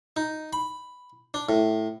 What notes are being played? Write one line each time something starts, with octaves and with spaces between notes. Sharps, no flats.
D#4
B5
D4
A2